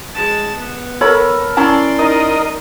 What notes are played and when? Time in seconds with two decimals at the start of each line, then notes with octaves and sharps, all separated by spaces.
0.15 G#3 A5
0.56 B3
1.01 A4 A#4 C#5 B5
1.57 C#4 E4 D5 A5 A#5 C6
1.99 D#4 A#4 D#5